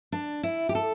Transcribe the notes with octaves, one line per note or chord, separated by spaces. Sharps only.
D4
E4
G4
A4